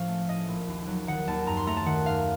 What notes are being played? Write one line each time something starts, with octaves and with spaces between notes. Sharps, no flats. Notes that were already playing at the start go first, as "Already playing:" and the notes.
Already playing: A2 F3 C#4 F5
A3
A2 D#5
A#1
D#2
F#3
D#3 F#5
D#2 A5
F#2 A#5
C6
A3 A#5
A5
D#3 F#5
F#2 F5